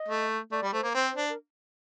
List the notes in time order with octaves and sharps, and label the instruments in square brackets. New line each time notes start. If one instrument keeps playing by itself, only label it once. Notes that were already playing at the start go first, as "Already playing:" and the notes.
Already playing: [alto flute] D#5
[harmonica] A3
[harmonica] A3 [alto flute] D5
[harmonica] G3
[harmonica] A3 [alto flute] C5
[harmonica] A#3
[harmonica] C4 [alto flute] C5
[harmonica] D4
[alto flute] A#4